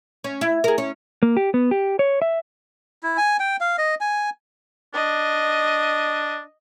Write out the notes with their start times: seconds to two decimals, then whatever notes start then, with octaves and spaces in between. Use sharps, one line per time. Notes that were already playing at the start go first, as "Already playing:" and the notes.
0.24 C#4
0.41 E4
0.64 G#4 A#4
0.78 C#4
1.23 A#3
1.37 G4
1.54 B3
1.71 G4
1.99 C#5
2.22 E5
3.03 E4
3.17 G#5
3.40 G5
3.61 F5
3.78 D#5
4.01 G#5
4.94 D4 D#5